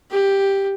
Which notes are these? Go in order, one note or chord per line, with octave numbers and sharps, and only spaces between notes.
G4